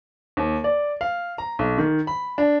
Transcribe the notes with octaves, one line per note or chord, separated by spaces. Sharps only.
D#2
D5
F5
A#5
B1
D#3
B5
D4